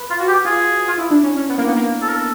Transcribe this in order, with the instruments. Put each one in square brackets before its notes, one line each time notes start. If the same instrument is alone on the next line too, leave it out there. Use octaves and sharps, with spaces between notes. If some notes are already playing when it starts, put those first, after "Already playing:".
Already playing: [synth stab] B4
[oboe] F4
[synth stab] F#4
[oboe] G4
[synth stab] F4 [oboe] G#4
[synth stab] F4
E4
D4
C#4
C#4
B3
A#3
B3
A#3
[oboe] A4
A#4
A4